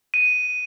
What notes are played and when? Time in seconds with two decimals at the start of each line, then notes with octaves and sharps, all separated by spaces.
0.14 D#7